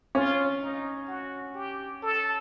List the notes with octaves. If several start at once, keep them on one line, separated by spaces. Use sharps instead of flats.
C#4 F4
D#4
F#4
G4
A4